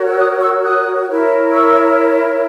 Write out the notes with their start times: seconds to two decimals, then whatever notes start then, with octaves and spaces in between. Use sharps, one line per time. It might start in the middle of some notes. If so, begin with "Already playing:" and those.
Already playing: F#4 A#4 C#5
0.08 E6
0.17 D#6 F#6
0.40 C#6 E6
0.62 D#6 F#6
1.07 E4 A#4 C#5
1.51 C#6 E6